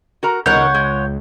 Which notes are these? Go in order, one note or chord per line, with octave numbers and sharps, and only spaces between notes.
F#4 A#4 A#5
C#2 B2 D#3 A#4 C#5 F#5 G6
G#3